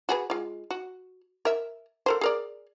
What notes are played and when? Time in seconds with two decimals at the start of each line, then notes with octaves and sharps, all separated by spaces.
0.09 F#4 G#4 B4
0.30 G#3 F4
0.71 F#4
1.45 A#4 E5
2.06 A4 A#4 C5
2.21 G#4 A#4 D5